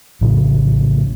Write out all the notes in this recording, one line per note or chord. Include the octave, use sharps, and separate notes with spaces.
A#1 A2 C#3